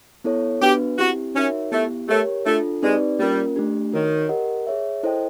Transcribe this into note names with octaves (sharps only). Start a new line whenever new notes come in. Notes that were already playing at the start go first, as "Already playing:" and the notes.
B3 E4 A4 C#5
B3 D4 F#4 G4 B4
C4 E4 F#4 G4
C#4 D#4 F#4 A#4 C#5 E5
A3 B3 E4 G4
A3 G4 A#4 C#5
A3 D4 F4 A4
G#3 C4 D#4 G4 B4 D5
G3 A#3 C#4 F4 A#4
A3 D4 G4
D#3 F#4 A#4 C#5
G4 A#4 D#5 F#5
G#4 C#5 E5
E4 A4 C5 D#5 G5